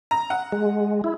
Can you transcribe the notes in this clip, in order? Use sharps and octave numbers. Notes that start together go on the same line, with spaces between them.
A#5
F#5
G#3
E4